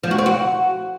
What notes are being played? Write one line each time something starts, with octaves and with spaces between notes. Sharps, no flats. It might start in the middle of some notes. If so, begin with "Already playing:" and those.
F3
F#4
C4
F#4